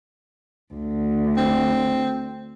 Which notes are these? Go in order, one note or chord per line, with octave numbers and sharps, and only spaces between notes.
D2
C4